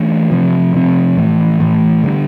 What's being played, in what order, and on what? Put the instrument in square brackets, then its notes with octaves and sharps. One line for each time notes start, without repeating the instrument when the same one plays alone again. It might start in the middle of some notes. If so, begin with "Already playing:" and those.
Already playing: [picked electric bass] E3 A3 D4
C3 F3 C4
C3 F3 C4
A2 E3 A3
A2 E3 A3
D3 G3 D4